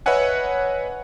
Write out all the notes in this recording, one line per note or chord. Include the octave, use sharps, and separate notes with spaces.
B4 C#5 D#5 E5 F#5 G#5